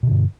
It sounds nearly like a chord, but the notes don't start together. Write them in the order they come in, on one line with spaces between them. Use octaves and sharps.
B2 D3 G2